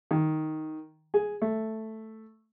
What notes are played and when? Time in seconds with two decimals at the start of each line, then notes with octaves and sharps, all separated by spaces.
0.11 D#3
1.14 G#4
1.42 A3